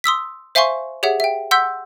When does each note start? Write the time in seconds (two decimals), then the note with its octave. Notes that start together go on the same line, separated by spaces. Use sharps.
0.04 C6 D#6 E6 B6
0.55 C5 E5 F5 G#5 C6 C#6
1.03 G4 G#4 C#5 E5 F#5
1.20 E5 G5
1.51 F#5 C6 E6 G6 B6